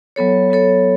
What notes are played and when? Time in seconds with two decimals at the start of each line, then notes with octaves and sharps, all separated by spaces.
0.16 F#3 B3 A4 C#5
0.50 F#3 B3 A4 C#5